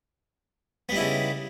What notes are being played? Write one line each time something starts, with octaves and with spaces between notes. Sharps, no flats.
C#3 G3 B3 D#4 E4